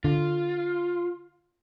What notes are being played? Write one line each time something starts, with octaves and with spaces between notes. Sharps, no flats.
D3 F4